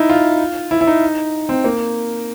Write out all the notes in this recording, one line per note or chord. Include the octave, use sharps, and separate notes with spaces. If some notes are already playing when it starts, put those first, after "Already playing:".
Already playing: D#4 E4
F4
E4
E4
D#4
C4
A#3